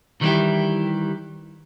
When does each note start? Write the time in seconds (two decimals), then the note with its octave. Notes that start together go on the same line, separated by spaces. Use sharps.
0.21 D#3 E3 G3 D#4 E4 G4